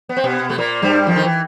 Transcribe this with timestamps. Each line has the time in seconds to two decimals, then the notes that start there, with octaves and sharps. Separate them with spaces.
0.09 B3
0.17 C4
0.24 B2 B3
0.50 A3
0.58 A#2 A#3
0.82 G2 G3
1.07 F2 F3
1.16 D#3
1.24 E3